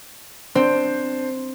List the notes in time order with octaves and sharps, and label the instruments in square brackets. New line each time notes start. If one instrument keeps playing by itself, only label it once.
[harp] C4 [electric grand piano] D4 C5